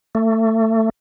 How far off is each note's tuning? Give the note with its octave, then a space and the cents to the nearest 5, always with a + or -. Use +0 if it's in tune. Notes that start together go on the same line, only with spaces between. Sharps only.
A3 +25